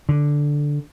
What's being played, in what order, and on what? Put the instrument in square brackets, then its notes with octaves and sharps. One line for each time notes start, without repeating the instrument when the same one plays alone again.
[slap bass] D3